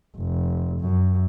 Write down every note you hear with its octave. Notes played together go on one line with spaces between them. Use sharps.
F1
F#2